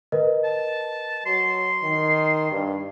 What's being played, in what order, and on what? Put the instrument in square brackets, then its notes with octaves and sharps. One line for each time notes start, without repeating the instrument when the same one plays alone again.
[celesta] A#4 B4 D#5
[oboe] A5
[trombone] F#3 [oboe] C6
[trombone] D#3
G2